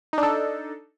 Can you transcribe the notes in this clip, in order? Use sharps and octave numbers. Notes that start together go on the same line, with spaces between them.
D4 D#4 A4